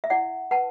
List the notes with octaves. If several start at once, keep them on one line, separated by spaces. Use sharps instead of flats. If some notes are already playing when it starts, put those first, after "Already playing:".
E5
E4 D5 F#5
B4 F#5 A5